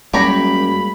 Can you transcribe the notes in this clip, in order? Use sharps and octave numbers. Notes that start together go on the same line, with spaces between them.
F#2 G3 G#3 A#3 G4 C#5 A#5 B5